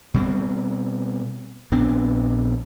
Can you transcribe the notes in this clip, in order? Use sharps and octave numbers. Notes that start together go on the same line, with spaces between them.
B2 G3 C4
A#1 B3 C4 D4